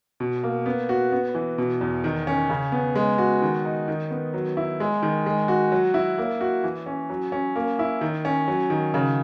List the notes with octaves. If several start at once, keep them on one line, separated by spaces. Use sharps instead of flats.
B2
A#3
B3
F#4
B3
E3
B2
E2
D#3
C#4
C#3
B3
G#3
F#4
D#3
D#4
D#3
B3
F#3
E4
G#3
D#3
G#3
F#4
F#3
E4
A#3
F#4
E3
C#4
F#3
C#4
A#3
E4
D#3
C#4
F#3
D#3
C#3